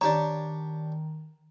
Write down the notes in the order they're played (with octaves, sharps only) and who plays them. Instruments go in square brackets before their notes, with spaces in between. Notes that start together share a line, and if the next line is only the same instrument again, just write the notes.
[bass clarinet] D#3 [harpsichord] D4 G4 C#5 [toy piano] A#5